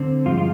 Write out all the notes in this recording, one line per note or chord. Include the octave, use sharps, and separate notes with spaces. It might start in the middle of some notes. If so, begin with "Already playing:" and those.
Already playing: D3 C4
G2 F3 G#3 F4
F4